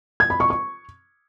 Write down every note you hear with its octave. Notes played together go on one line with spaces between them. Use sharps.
G#6
B5
C#6
C#6